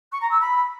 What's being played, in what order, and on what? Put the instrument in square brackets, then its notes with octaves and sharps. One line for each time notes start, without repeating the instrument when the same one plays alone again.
[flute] C#6
A#5
E6
B5